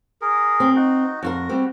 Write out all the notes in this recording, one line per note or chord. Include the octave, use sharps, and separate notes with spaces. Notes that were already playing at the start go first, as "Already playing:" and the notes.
G#4 A#4
C4
D#4 F#4
F2 F4 F#4 A#4
G3 C4